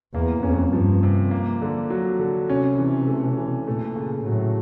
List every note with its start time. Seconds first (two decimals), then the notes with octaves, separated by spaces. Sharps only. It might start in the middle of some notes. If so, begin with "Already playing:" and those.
0.14 E2 A#3
0.43 F2 C#4
0.72 G2 F3
1.03 C3
1.31 A#3
1.62 D3
1.90 F#3
2.19 D3
2.49 C3 C#4
2.78 E3
3.08 A3
3.38 E3
3.67 A#2 A3
3.96 C#3
4.25 A2 F#3